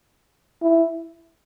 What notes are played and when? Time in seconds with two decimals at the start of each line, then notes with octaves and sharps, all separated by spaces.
0.62 E4